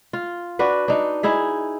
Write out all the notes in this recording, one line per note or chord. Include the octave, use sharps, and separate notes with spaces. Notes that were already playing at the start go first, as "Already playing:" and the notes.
F4
D4 F#4 B4
D4 D#4
D#4 E4 G#4 E5